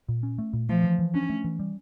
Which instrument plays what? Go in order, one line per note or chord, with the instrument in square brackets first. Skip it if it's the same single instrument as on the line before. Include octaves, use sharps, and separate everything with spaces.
[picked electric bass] A#2
C#4
A3
A#2
[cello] F3 [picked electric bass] A3
[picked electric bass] E3
E3
[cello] C#4 [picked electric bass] D4
[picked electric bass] A3
E3
G3